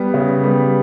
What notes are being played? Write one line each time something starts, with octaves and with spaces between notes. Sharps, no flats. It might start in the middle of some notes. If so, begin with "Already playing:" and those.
Already playing: G3 B3
C#3
G3 B3